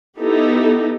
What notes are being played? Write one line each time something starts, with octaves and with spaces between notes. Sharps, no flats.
B3 D#4 E4 G4 A4